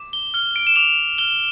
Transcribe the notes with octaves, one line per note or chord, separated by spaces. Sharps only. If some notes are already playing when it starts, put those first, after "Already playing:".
Already playing: D6
G7
F6 G7
D7
E7
D6 F7
F6 G7